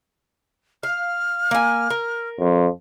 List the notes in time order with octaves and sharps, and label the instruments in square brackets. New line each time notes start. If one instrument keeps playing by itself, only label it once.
[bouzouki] F5 [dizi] F6
[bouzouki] A#3 G#5
A#4
[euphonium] F2